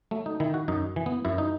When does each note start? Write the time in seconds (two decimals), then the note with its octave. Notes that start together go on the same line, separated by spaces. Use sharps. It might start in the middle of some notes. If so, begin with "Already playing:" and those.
0.11 F#3 A3
0.26 D#4
0.40 D#3 E4
0.54 F#4
0.68 F#2 D#4
0.96 E3
1.06 B3
1.25 F#2 E4
1.38 D#4